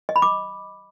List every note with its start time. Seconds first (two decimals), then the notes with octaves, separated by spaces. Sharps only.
0.09 D#5
0.16 B5
0.22 D6